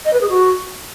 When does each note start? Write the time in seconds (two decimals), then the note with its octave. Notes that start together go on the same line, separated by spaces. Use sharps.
0.05 D#5
0.13 B4
0.21 G#4
0.29 F#4